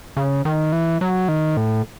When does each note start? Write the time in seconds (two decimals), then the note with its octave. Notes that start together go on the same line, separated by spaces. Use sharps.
0.17 C#3
0.45 D#3
0.72 E3
1.01 F#3
1.28 D#3
1.57 A2